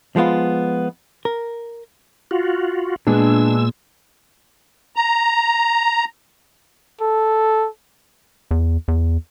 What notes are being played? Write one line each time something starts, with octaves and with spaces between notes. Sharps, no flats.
F3 G#3 B3 F4
A#4
F4 F#4
A#2 G#3 B3 D4 G#4 E6
A#5
A4
E2
E2